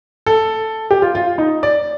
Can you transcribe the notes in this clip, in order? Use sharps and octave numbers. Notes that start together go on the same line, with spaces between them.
A4
G4
F4
F4
D#4
D5